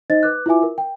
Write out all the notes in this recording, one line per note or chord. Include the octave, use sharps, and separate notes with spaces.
D#4 C5 D#5 A6
B4 D6 F#6
E4 F4 B4 E5 G#5 D6
A#4
G5